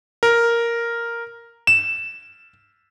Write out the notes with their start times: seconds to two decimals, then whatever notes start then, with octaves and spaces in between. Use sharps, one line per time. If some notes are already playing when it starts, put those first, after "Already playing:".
0.23 A#4
1.67 E7